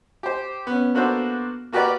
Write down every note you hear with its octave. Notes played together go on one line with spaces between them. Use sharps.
G4 C5
B3 C#4
A#3 B3 D4 F#4 A4 C5
A#3 F#4 G4 A#4 B4 D5